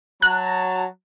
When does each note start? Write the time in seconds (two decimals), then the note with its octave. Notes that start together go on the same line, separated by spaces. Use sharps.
0.22 F#3 A5 A#5 F#6